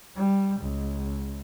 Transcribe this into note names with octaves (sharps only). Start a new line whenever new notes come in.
G3
C#2